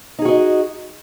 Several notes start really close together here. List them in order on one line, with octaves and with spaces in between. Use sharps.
D#4 G#4 F#4 D#5